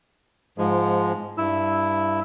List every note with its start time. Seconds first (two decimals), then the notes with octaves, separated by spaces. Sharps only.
0.58 G#2 F3 G#3
1.38 G2 E4 E6